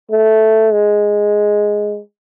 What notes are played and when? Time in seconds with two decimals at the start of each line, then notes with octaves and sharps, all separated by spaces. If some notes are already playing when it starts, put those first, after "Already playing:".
0.11 A3
0.73 G#3